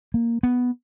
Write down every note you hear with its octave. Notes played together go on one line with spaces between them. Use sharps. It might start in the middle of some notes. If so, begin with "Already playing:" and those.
A#3
B3